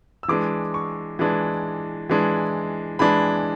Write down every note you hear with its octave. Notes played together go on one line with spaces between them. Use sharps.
E6
E3 G#3 D4 D6
C#6
E3 G#3 D4
E3 G#3 D4
E3 G#3 D4 B5